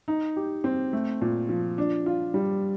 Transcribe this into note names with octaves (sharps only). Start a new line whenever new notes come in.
D#4
G4
C4
A3
A#2
F3
D4
F4
G3